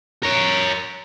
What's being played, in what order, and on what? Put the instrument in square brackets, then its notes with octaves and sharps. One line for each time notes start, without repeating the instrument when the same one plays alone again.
[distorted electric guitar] A#4 C#5